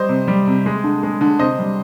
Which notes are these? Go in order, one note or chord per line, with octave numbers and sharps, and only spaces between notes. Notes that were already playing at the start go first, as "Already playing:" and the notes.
Already playing: G3 C5 D#5
C3
G3
C3
G#3
D3
G#3
D3
C3 C5 D#5
G3